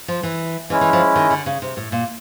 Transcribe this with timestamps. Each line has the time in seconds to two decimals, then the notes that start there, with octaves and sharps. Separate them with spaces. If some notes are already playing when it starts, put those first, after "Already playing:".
0.08 F3
0.23 E3
0.70 E3 G#3 C#4 E4
0.81 E3
0.93 F3
1.16 D#3
1.31 D3
1.46 C#3
1.62 C3
1.77 A2
1.92 A#2